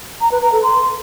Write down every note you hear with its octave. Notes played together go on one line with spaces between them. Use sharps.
A#5
B4
A#5
A4
C6